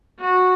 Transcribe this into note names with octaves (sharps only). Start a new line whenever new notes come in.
F#4